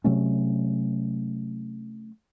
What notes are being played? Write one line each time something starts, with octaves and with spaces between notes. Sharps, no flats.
C3 F#3 A3 C#4